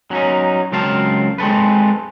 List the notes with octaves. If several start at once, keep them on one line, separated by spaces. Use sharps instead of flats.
F#3 C#4 D#4
C#2 F#3 C4 A#4 F5 A5
G#3 C4 A4 B4